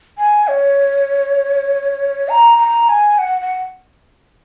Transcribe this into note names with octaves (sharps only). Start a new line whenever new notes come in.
G#5
C#5
A#5
A#5
G#5
F#5
F#5